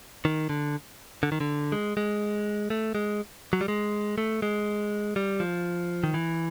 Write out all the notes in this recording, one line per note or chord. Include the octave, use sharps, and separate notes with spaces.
D#3
D3
D3
D#3
D3
G#3
G#3
A3
G#3
F#3
G3
G#3
A3
G#3
G3
F3
D#3
E3